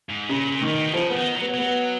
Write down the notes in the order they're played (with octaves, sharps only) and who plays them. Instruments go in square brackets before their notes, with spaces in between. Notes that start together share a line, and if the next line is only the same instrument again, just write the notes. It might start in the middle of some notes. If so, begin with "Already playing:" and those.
[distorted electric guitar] G#2
[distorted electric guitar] A#2 [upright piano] C#3
[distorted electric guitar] A#2
[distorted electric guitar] A#2 [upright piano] D#3
[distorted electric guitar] B2
D#3
[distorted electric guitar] C#3 [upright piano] F3
[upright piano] B3
[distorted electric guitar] D#3
F#3
[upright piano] B3
[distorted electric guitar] F#3 [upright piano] B3